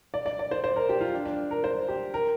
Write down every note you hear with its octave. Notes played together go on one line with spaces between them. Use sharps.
D5
D5
D5
C5
C5
A#4
G4
F4
D4
D4
A#4
C5
G4
A#4